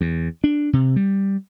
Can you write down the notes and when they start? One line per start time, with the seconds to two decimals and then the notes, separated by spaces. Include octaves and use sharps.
0.01 E2
0.44 D4
0.73 C3
0.96 G3